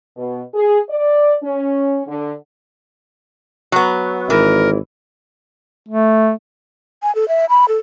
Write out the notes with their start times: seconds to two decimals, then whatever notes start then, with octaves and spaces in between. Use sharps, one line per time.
0.16 B2
0.54 G#4
0.89 D5
1.43 C#4
2.07 D3
3.72 F#3 B3
4.30 G#1 E3 A#4
5.89 A3
7.03 G#5
7.15 A4
7.28 E5
7.49 B5
7.68 A4